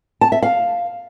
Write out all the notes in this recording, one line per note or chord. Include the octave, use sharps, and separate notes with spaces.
A5
E5
F5